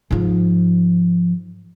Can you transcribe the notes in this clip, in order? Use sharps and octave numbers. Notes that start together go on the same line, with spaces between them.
G#2 F3